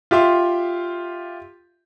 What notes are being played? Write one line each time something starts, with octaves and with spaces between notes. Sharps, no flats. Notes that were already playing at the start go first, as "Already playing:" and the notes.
F4 G4 E5 C6